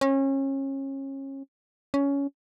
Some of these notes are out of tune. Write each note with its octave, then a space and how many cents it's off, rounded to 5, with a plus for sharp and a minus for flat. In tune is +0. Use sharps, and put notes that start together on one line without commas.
C#4 -30
C#4 +15